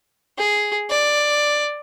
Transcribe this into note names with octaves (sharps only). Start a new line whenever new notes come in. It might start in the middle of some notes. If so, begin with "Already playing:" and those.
G#4
D5